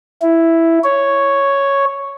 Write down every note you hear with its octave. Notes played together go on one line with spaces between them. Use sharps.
E4
C#5